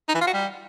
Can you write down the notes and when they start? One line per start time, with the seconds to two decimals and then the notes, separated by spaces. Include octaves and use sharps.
0.08 D#4
0.15 E3
0.21 F4
0.27 F#4
0.34 G3